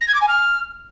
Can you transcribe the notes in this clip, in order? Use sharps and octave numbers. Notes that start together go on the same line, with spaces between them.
A#6
G#6
D6
G#5
F6